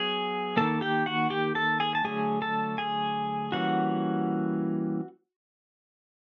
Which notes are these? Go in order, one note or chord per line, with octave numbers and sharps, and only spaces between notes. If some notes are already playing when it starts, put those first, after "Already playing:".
Already playing: F#3 B3 G#4 G#5
D#3 G3 A#3 A4 A5
G4 G5
F#4 F#5
G4 G5
A4 A5
G#4 G#5
A5
D3 F#3 A3 G#4 G#5
A4 A5
G#4 G#5
E3 G3 A#3 C#4 F#4 F#5